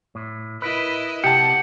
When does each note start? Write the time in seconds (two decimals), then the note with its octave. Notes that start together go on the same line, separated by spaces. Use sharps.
0.15 A2
0.62 E4 A#4 B4 D#5
1.24 C3 G4 F#5 G5 A5 C#7